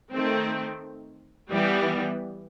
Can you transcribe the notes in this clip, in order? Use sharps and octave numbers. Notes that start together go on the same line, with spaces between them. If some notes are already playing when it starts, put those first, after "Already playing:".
D#3 A3 C4
E3 G3 B3